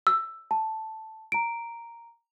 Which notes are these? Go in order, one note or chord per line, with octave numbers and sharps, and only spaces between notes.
E6
A5
A#5 D7